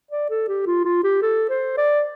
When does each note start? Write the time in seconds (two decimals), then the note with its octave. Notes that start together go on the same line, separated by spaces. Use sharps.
0.11 D5
0.30 A4
0.48 G4
0.66 F4
0.85 F4
1.04 G4
1.22 A4
1.49 C5
1.78 D5